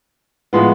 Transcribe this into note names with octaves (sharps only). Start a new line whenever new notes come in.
A2 F3 G#3 B3